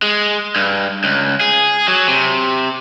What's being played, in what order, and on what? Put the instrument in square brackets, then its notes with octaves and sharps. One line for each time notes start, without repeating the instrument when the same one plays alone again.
[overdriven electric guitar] G#3
G2
C#2
G#4
F#3
C3